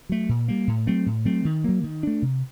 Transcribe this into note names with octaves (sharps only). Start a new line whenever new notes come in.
F#3 A3
A#2
G3 A#3
A2
F#3 A3 C4
A2
F#3 A3 C4
D#3
F#3 A#3
D#3
A3 D4
C3